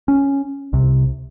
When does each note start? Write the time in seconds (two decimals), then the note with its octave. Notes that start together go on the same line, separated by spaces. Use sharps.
0.08 C#4
0.73 C2 C3